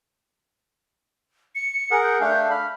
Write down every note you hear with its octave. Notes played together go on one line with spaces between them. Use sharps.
C#7
G#4 A#4 F#5
G6
A3 D4 F5
B5 F6